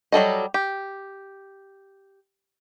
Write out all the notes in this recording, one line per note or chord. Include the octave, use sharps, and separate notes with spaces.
F#3 G3 A4 D#5
G4